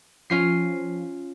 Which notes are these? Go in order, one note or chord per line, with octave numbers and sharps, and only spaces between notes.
F3 C#4 F4 C7